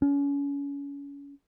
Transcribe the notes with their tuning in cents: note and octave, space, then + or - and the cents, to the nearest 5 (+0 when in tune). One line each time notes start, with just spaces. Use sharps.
C#4 +30